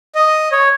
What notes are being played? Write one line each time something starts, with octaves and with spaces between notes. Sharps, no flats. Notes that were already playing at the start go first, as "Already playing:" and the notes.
D#5
C#5